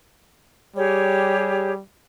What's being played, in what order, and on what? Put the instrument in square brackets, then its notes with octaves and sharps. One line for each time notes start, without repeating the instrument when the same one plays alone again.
[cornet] G3 [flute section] G4 G#4 C#5